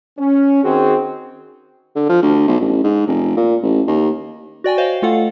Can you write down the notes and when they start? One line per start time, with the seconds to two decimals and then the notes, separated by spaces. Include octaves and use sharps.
0.18 C#4
0.64 D#3 C4 F#4 G#4
1.96 D3
2.10 F3
2.23 D2
2.48 B1
2.61 A1
2.84 G#2
3.07 F1
3.37 A#2
3.63 A1
3.88 D#2
4.64 F#4 D5 G5 G#5
4.78 C5 C#5 D#5 F5
5.02 A3 F4 A4 F5 F#5